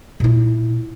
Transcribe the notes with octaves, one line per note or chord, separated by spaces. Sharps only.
A#2 E4